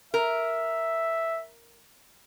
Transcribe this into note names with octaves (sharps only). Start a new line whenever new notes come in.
A#4 E5